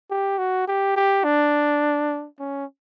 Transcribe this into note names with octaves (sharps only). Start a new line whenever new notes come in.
G4
F#4
G4
G4
D4
C#4